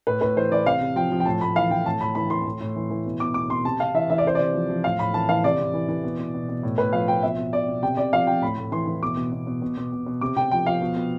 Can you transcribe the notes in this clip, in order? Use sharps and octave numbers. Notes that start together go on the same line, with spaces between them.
A2 B4
A2 B4
E3 C5
E3 D5
C3 F5
C3
F3 G5
F3
G5
A2 A5
A2 B5
E3 F5
E3 G5
A2 A5
A2 B5
E3 B5
E3 C6
A2
A2
E3
E3
B2
B2 D6
B2 D6
B2 C6
C3 A5
C3 F5
E3 E5
E3 E5
D5
C3 C5
C3 D5
F3
F3
A2 F5
A2 B5
E3 A5
E3 F5
C3 D5
C3
E3
E3
B2
B2
B2
B2
A2
A2 B4
F3 F5
F3 G5
B2 E5
B2
B2 D5
B2
C3 G5
C3 D5
F3 F5
F3 G5
A2 B5
A2
E3 C6
E3
B2 D6
B2
B2
B2
B2
B2
B2
B2
C3 D6
C3 G5
F3 G5
F3 F5
B2
B2